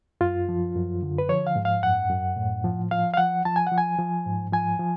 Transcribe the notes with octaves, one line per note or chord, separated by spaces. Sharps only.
F#2 F4
F3
F#2
D3
B4
F3 C#5
F5
G#2
F5
F#2 F#5
F#2
A2
F3
F3 F5
F5
F3 F#5
F3 A5
G#5
F3 F#5
G#5
F3
G#2
F3 G#5
F3